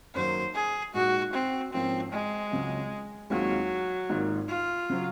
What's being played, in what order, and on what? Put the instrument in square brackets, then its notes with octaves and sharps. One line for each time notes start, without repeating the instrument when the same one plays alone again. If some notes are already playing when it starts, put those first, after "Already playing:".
[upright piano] F#2 D#3 F#3 A#3 [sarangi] C5
[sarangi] G#4
[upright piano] A#2 G#3 D#4 [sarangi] F#4
[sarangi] C4
[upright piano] G#2 F3 A#3 C#4 [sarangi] C4
[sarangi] G#3
[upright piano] C#2 C#3 F#3 C4 F4
[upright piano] D#2 D#3 G#3 C4 F4 [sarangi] F#3
[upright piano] G#1 G#2 D#3 A#3 F4
[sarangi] F4
[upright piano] C#3 F#3